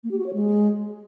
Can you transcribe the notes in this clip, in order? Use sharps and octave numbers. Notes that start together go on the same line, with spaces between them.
A#3
G4
F#4
C#5
G#3